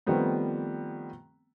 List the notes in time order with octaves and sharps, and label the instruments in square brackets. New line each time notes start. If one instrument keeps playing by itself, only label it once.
[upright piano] D#3 F3 G3 A3 B3 C4